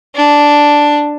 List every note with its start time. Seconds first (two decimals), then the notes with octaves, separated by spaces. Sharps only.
0.15 D4